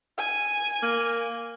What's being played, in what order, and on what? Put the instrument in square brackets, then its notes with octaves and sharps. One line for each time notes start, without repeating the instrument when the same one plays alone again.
[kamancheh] G#5
[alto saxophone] A#3